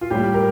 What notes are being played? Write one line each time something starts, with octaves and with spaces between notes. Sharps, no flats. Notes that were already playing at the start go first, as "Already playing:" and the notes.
F4
A2 G3 G4
A#4